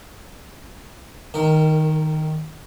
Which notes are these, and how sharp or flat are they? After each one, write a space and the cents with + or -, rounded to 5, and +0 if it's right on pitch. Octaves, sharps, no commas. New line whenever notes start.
D#3 +0 A#4 -30